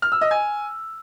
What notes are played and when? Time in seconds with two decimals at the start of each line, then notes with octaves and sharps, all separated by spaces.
0.02 F6
0.12 E6
0.21 D#5
0.31 G#5